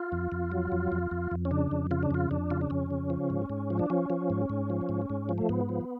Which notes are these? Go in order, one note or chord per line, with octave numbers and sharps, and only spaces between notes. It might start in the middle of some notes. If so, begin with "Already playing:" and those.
Already playing: F4
F2
F2
F#3
F2
F2
F2
F2
C#4
C#3 D4
F2
C#3 F4
D4
F2 F4
F2 D4
C#3 F4
D4
F2 C#4
C#3
F3
G#2
G#2
F3
D4
F3 C#4
F3
G#2
G#2
F3
G#2
G#2
F3
A3
G#2 B3
F3